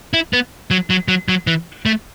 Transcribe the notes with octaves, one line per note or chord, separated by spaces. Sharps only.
E4
B3
F#3
F#3
F#3
F#3
E3
A3